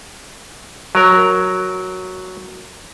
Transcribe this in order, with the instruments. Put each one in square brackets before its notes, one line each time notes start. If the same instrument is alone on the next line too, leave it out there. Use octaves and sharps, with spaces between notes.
[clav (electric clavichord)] F#3 A#4